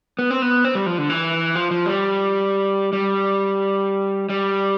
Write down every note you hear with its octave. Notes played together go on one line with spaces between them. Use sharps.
B3
C4
B3
C4
G3
F3
D3
E3
F3
F3
G3
G3
G3